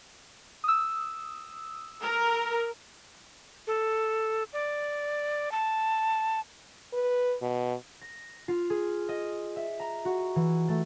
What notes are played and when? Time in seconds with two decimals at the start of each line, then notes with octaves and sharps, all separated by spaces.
0.64 D#6 E6
2.03 A#4
3.67 A4
4.53 D5
5.52 A5
6.93 B4
7.42 B2
8.01 A#6
8.48 F4
8.70 G#4
9.08 D#5
9.56 E5
9.80 A#5
10.05 F#4
10.36 E3
10.68 A3